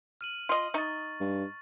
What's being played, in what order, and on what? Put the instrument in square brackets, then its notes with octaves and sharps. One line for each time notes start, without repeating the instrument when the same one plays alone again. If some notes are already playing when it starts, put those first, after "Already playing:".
[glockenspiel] F6 D#7 F#7
[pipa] F4 D#5
[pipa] D#4 [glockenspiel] C#6 A6
[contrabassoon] G2